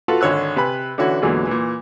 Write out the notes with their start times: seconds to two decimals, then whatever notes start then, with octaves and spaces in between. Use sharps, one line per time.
0.08 F4 F#4 A4 B4
0.21 G#1 D3 C#5 E6 F#6
0.56 C3 B4 G#5 B5
0.98 D3 E3 C#4 E4 F#4
1.22 E2 A#2 D3 E3 F#3 G#3
1.47 A#2 E3